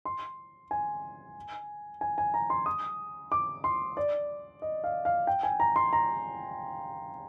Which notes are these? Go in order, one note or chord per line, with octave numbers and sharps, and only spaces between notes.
C6
G#5
G#5
G#5
A#5
C6
D#6
D6
C6
D5
D#5
F5
F5
G5
G#5
A#5
C6
A#5